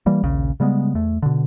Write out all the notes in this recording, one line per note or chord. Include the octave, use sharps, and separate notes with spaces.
E3 G3 A#3
A#1 D#2 C#3
C#3 G3 G#3 B3
E2 A3
B2 D3